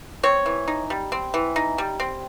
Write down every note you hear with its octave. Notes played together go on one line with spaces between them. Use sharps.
C4 C#5
E3
D#4
G3
C4
E3
D#4
G3
C4